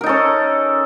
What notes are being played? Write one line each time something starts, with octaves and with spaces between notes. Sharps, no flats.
C#4 D#4 A4 A#4